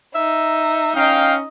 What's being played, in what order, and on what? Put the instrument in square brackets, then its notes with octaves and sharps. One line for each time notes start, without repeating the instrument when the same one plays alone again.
[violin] D#4 [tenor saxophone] E5
[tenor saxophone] C#4 [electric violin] D#5 [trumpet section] F5 G5